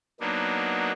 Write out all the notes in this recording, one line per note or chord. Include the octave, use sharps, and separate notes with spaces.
F#3 A#3 B3 D4 D#4